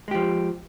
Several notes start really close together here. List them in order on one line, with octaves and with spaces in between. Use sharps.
G#3 G4 F3